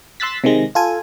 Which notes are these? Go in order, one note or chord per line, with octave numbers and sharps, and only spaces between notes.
C6 E6 F#6 A6 B6
C3 D#3 G#3 A#6
F4 A4 G#5